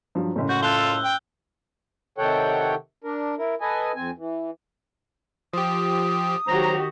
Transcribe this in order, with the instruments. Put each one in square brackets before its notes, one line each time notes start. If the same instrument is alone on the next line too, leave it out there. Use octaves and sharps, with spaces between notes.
[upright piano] G2 F3 F#3
F#1 A2
[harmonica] F#4 [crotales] G6
[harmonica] F4 A4 [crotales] E6 F#6 G7
[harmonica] G5
[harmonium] C3 D#3 A4 C#5 F#5 G5
D4 A#4
E4 A#4
A4 B4 D#5 G#5
F2 C4 G#5
E3
[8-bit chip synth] F3 G4 [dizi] D#6
[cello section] D#3 F#4 G4 [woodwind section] F#3 C5 A#5